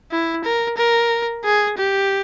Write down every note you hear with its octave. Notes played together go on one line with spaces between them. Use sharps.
E4
A#4
A#4
G#4
G4